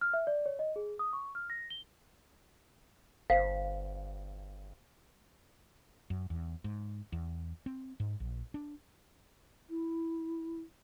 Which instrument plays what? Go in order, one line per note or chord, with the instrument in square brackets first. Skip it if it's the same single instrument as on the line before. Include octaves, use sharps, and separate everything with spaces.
[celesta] F6
E5
D5
C#5
D#5
G#4
D#6
C#6
F6
A#6
G7
[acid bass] G1 [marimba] C5 [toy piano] F5
[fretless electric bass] F#2
E2
G#2
E2
C4
G#2
A#1
D4
[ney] E4